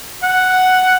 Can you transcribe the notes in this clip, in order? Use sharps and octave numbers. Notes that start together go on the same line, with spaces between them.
F#5